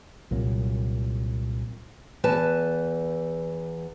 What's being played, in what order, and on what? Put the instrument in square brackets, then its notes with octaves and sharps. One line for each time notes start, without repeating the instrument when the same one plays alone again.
[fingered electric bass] C2 A#2 F#3
[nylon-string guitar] E2 B4 A5